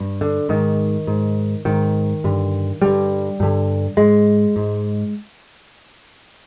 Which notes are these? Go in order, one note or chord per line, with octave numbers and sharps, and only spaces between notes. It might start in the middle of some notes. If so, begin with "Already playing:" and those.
Already playing: G2
D3
G#2 D#3
G#2
G#2 D#3
G2 D3
G2 D3 G3
G2 D3
G#2 G#3
G#2